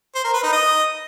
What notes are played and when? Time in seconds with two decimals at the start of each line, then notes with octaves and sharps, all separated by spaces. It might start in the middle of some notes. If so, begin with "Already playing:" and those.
0.15 C5
0.24 A#4
0.34 B4
0.43 D#4
0.52 D#5